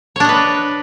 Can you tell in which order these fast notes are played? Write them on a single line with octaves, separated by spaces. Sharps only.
C#5 D4 D#5 B4